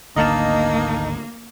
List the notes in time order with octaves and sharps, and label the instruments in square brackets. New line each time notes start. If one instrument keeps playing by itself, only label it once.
[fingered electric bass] G#1 D2 D3 [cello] A#3 [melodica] D#4 [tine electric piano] D#5 F5 A5